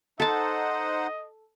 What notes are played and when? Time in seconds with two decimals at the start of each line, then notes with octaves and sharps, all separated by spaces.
0.20 D#4 A4 C5 D#5 F#5 A5